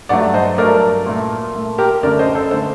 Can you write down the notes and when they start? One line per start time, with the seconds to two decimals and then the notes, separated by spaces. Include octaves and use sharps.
0.09 G2 F#3 A3 D5 F#5
0.34 C5 D#5
0.58 G2 F#3 A3 A#4 D5
1.06 A#2 A3
1.55 A#2 A3
1.78 G4 A#4
2.03 F#2 D3 A3 A#4 D5
2.19 C5 D#5
2.35 A4 C5
2.50 D3 A3 A4 C5